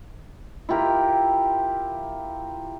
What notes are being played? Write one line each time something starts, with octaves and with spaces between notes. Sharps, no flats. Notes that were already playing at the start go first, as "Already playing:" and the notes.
E4 F4 G4 A#4